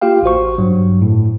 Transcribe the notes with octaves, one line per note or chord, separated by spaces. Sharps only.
A#3 F4 G4 F5 G5
A1 F#4 C5 C#6
G2 F#3
A2